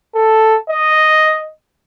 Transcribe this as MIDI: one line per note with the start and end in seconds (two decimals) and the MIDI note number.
0.15 0.55 69
0.70 1.48 75